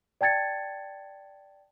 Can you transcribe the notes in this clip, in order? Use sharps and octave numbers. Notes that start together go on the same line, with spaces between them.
D5 G5 A5 G#6 A6 C#7